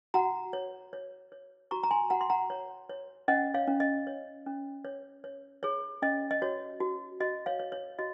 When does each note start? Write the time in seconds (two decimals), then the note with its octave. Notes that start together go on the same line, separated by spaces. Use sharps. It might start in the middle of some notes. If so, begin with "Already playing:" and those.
0.14 F#4 F#5 A#5
0.53 C#5
0.93 C#5
1.32 C#5
1.71 F#4 A#5 C#6
1.83 A#5
1.91 G#5 C6
2.10 F#4 F#5 A#5
2.21 C6
2.30 F#5 A#5
2.50 C#5
2.89 C#5
3.28 C#4 D#5 F#5
3.54 C#5 F5
3.67 C#4
3.80 D#5
4.07 C#5
4.46 C#4
4.85 C#5
5.24 C#5
5.63 G#4 C#5
6.02 C#4 D#5
6.31 D#5
6.42 F#4 C#5
6.80 F#4
7.20 F#4 D#5
7.46 C#5 F5
7.59 C#5
7.72 C#5
7.99 F#4 D#5